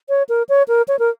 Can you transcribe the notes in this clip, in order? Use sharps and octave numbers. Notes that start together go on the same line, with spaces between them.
C#5
A#4
C#5
A#4
C#5
A#4